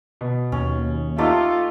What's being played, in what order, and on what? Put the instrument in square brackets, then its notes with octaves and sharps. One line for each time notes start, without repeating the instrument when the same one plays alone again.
[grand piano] B2
[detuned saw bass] D#2 [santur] C#4
[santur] A3 A4 D6 [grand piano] D#4 G4 [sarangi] F4